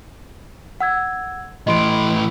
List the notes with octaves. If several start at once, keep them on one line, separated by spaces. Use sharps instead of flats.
F#5 E6 G#6
A2 E3 D#5 C6 D7